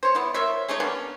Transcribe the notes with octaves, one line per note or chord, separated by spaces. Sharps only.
C5 C#5
B3 E4
A#4 C5 C#5 E5
G#3 A3 D#4 C#5
A#3 B3 C#4 D4